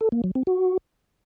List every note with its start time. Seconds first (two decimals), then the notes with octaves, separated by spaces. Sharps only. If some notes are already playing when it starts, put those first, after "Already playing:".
0.01 A4
0.12 A#3
0.24 F#3
0.35 C4
0.47 F#4